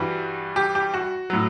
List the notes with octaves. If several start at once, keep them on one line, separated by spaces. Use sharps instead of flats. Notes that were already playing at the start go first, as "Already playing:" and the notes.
Already playing: G2 E3 G3 F#4
G4
G4
F#4
A2 F#3